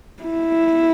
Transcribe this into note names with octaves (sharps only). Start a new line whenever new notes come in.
E4